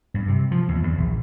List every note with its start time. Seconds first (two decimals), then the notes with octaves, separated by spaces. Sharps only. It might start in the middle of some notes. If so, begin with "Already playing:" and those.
0.14 G2
0.28 C3
0.51 F3
0.68 D#2
0.83 E2
0.98 A#1